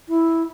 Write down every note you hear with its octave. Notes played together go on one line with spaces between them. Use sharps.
E4